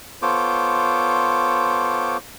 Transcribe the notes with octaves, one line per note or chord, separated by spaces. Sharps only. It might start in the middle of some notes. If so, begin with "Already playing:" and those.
B3 F4 A4 C5 C#5 D6